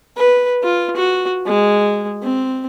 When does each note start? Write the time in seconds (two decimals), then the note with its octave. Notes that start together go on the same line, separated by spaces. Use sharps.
0.16 B4
0.63 F4
0.96 F#4
1.46 G#3
2.22 C4